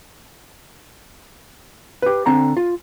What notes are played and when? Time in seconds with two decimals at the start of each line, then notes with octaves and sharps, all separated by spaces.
2.02 G4 B4
2.26 D3 C4 A5 A#5
2.57 F4